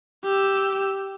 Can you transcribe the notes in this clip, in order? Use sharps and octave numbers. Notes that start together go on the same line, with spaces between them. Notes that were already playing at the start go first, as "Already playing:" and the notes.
G4 E6